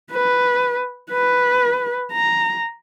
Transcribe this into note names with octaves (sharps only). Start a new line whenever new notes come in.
B4
B4
A#5